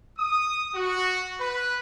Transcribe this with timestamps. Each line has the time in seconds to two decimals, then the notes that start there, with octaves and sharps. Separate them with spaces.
0.18 D#6
0.75 F#4
1.40 B4